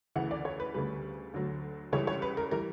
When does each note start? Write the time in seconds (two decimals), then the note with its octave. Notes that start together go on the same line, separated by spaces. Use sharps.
0.16 D2 C#3 E3 F#5
0.31 D5
0.45 C#5
0.60 B4
0.74 D2 C#3 G3 B4
1.34 D2 D3 F#3
1.92 C#2 C#3 E3 G3 C#5
2.07 C#5
2.22 B4
2.37 A#4
2.51 E3 G3 A#4